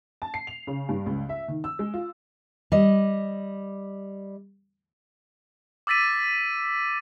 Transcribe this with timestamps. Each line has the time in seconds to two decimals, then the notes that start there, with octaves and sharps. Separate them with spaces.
0.22 A5
0.34 C7
0.47 F7
0.67 C#3
0.89 G2
1.06 C#2
1.29 E5
1.48 D#3
1.64 E6
1.79 G#3
1.94 F4
2.72 G3 D#5
5.87 D6 E6 A6 B6 D#7